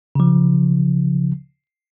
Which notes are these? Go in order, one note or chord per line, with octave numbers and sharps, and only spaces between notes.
C#3 F3